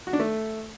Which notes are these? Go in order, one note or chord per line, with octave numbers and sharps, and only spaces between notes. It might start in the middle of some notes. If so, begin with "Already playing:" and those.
F#4
D4
A3